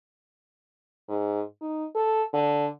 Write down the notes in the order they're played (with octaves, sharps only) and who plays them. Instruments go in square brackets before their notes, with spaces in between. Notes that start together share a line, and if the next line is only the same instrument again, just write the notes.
[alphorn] G#2
D#4
A4
D3